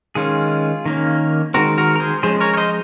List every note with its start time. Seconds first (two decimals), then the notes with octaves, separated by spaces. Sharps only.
0.15 D#3 G#3 C#4 F4 G#4
0.86 D#3 A#3 C#4
1.54 D#3 G#3 C4 F#4 A#4
1.78 F#4 A#4
1.96 A#4
2.00 G#4 C5
2.23 F3 G#3 C#4 G#4 C5
2.40 A#4 C#5
2.54 C#5
2.57 C5 D#5